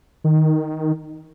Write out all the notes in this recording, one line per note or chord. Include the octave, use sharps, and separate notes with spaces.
D#3